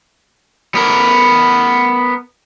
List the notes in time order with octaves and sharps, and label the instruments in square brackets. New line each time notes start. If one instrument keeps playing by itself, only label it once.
[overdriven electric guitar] B3 A#4